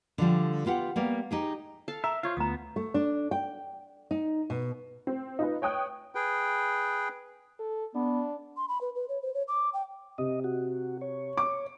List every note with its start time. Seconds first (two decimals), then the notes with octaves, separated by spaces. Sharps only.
0.18 D3 F3 G3
0.66 B3 F4 G4 F#5
0.96 G3 A#3 B3
1.31 D#4 G4 G#4
1.88 A4 F5 A5
2.04 A#4 E5 A#5
2.23 F4 C5 C#5 F5
2.37 D2 D3 A3 B3 A#5 D#6
2.76 A3
2.94 D4
3.31 G5
4.11 D#4
4.50 B2
5.07 C4
5.39 D#4 F4 B4
5.62 C#5 G5 D#6 F#6
6.15 G#4 B4 G5
7.59 A4
7.95 B3 D4
8.57 C6
8.68 B5
8.81 B4
8.95 B4
9.09 C#5
9.22 C5
9.34 C#5
9.48 D6
9.73 G5
10.18 C3 D#5
10.44 F#4
11.01 C#5
11.37 D6